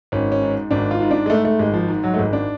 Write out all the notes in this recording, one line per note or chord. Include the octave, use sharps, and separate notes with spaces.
G#1 C#4
C#4
G#2
G#1 D4
F4
G#2
D4
G#3
G#2 A3
A3
G#1 G#3
F3
G#2
F#3
A3
G#1 G#3
D4